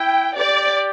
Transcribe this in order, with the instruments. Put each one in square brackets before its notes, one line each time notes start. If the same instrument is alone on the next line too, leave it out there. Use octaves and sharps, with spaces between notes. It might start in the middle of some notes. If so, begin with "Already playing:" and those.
Already playing: [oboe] E4 [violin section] G5
[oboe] G4 [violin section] D5